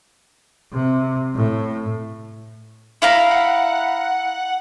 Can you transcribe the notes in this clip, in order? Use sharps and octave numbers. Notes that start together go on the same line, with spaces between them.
C3
A2
E4 F5 A#5
F#5